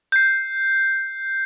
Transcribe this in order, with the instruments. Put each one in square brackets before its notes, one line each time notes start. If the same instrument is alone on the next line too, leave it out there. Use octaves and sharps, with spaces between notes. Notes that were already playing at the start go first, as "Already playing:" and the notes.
[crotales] G6 C7